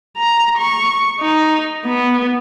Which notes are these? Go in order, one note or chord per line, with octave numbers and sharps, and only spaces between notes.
A#5
C#6
D#4
B3